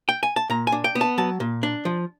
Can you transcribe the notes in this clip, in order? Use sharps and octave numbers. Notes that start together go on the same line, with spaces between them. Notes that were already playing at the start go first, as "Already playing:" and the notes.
G5
G#5
A5
A#2 A#5
G#5
D4
G5
B3
A5
F#3 A5
A#2
D4
F3